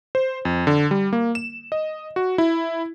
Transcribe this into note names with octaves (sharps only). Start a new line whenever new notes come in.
C5
F2
D3
G3
A#3
E7
D#5
F#4
E4